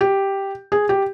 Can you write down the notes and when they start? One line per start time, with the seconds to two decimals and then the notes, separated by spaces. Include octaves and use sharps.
0.01 G4
0.72 G#4
0.89 G4